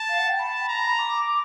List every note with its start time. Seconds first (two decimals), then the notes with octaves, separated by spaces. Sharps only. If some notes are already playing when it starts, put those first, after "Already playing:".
Already playing: A5
0.08 F5
0.18 F#5
0.28 G5
0.38 A5 B5
0.68 A#5
0.98 D6